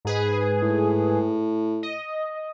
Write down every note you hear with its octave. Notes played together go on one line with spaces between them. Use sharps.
G#2 G#4 B4
A2
D#5